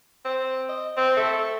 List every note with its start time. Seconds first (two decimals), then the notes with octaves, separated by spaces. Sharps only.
0.25 C4
0.69 D#5
0.97 C4
1.17 A3